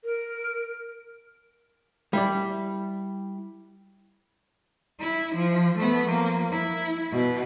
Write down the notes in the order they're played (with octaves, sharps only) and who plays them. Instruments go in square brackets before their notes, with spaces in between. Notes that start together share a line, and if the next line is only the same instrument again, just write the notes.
[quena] A#4
[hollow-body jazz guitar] G3 E4 D5
[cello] E4
F3
A3 B3
F3 A#3
E4
B2